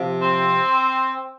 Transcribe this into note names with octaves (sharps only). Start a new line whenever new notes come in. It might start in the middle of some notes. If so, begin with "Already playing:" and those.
Already playing: C3 F3
C4